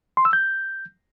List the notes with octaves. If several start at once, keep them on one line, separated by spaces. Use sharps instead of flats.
C6
E6
G6